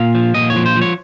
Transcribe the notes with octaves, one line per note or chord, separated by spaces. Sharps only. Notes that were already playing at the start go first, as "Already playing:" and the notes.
Already playing: A#2 F5
F3
A#2 D#5
C#5
F3
C5
F3
C#5